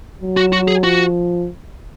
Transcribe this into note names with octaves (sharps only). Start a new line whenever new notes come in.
F#3
F#4
F#4
G#4
F3 F#4